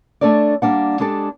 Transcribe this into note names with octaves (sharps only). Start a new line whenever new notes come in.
A3 D4 A4 C#5 D5
G3 A#3 D4 F#5
G#3 D4 G4 A4